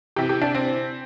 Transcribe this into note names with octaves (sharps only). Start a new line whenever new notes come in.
C3 E3 G4
G4
D4
C4